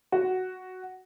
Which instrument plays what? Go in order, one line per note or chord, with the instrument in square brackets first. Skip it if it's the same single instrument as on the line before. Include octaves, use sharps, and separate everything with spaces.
[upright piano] F#4